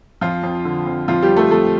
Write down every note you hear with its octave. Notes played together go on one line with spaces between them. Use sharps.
F2 F3 F4
F2
D3
F2
F2 F3 F4
G3 G4
F2
A3 A4
F2 A3 A4